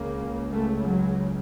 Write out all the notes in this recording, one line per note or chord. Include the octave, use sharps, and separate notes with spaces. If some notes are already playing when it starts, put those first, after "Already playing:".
Already playing: C#2 C#3 A#3
A3
F#3